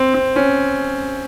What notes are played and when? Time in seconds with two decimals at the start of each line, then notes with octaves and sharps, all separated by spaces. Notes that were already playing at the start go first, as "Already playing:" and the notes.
Already playing: C4
0.14 C4
0.36 C#4